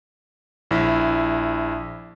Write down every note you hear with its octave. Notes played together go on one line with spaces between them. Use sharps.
A#1 E4